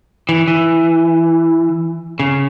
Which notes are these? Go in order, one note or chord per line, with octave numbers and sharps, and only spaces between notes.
E3
E3
C#3